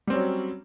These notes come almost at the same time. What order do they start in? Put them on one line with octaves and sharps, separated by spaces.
G3 C4 C#4 F#3